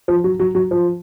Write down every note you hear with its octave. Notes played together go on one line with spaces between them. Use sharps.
F3
F#3
F#3
F#3
F3